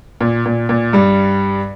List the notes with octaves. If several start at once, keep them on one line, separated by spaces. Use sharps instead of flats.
A#2
A#2
A#2
G2 G3